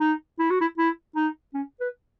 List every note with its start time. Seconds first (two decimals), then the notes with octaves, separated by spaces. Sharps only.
0.01 D#4
0.39 E4
0.50 F#4
0.61 E4
0.78 E4
1.16 D#4
1.54 C#4
1.80 B4